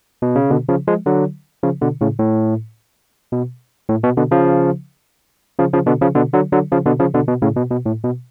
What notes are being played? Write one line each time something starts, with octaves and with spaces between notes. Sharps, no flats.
B2
C#3
B2 D3
C#3 F3
F3 G#3
D3 F#3
C#3 F3
B2 D3
A2 C#3
A2
B2
A2
B2
B2 D3
C#3 F3
C#3 F3
C#3 F3
B2 D3
C#3 F3
B2 D3
D3 F#3
D3 F#3
C#3 F3
B2 D3
C#3 F3
B2 D3
B2
A2 C#3
B2
B2
A2
B2